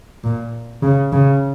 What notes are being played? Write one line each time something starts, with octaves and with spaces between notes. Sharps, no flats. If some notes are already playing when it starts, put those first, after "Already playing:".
A#2
C#3
C#3